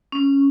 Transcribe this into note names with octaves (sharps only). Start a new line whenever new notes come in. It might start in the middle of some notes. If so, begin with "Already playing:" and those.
C#4